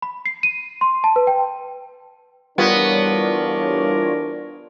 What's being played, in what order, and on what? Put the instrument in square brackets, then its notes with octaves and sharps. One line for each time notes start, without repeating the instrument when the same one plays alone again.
[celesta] B5
C7
D#7
C6
A5
B4
G5
[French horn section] D2 E3 D4 [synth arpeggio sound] G3 F4 C#5 [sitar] B3 [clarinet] A#4